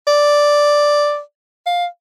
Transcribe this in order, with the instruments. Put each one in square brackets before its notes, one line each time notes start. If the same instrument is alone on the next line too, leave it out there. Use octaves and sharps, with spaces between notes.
[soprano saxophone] D5
F5